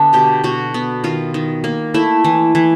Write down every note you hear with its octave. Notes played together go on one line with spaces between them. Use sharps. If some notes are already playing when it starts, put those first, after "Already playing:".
Already playing: D3 B3 D4
B2 G4
B2 F#4
B3
D#3 F4
D#3
A#3
A3 E4
E3
E3